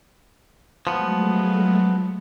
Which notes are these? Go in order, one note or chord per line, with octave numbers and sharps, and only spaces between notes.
F3 F#3 G#3 A3 B3